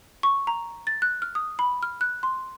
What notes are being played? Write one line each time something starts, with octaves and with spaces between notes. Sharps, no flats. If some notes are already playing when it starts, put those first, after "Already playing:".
C#6
A#5
A6
F#6
F6
D#6
B5
F6
F#6
C6